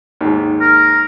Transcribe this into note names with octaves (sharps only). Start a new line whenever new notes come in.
D#2 G#2
A#4